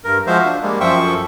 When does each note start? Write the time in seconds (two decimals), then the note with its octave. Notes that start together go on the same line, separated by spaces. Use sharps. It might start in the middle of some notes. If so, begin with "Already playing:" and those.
0.04 G2 A#4
0.27 F3 G#3 F#4 C5 E5 F5
0.45 D4
0.62 G3 G#3 A#3
0.81 F#2 F3 C5 E5 G5 C#6
1.04 A4